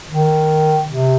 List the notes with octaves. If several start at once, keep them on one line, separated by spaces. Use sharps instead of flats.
D#3
C3